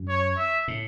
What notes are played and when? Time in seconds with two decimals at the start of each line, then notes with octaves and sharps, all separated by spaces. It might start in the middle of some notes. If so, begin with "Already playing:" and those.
Already playing: F#2
0.09 C#5
0.38 E5
0.68 A2